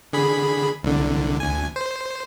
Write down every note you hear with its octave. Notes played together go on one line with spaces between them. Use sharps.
D3 G#4 B5
C2 D3
D2 G#5
C5